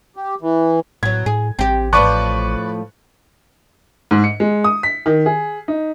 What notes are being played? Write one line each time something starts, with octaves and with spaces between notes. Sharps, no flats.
G4
E3
A2 F#3 B3 G#6
A2 G#4
A1 C4 G4
A2 F3 B4 D5 A5 C#6 D6 F#6
G#2
C#7
G#3
D#6
B6
D#3
G#4
D#4